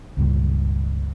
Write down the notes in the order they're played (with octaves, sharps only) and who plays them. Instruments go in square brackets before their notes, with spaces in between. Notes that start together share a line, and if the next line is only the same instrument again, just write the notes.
[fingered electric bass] C#2 G2 A#2